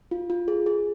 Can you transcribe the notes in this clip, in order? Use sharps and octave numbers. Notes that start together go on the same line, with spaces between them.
F4
F4
G#4
G#4